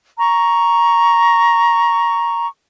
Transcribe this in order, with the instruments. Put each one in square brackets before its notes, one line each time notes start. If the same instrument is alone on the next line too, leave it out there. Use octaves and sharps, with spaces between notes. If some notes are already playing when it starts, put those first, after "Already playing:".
[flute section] A#5 C#6